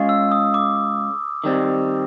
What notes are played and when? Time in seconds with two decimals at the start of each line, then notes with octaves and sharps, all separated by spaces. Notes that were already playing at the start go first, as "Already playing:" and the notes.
Already playing: G#3 C#4 F4 G#4
0.09 E6
0.32 D#6
0.54 D6
1.44 D#3 G3 C4